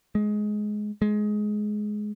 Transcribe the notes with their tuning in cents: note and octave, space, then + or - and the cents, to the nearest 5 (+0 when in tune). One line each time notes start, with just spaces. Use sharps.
G#3 +15
G#3 +15